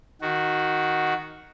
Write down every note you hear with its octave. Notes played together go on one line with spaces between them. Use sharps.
D#3 F#4